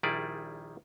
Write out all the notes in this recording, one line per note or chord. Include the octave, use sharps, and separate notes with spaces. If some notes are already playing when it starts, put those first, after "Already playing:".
A#1 D#3 G3 E4 G#4 D5